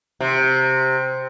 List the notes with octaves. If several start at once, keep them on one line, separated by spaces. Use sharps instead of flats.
C3